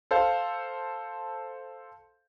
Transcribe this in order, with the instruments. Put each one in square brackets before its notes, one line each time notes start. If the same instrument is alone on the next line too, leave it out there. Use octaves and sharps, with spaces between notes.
[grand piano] A4 C5 F5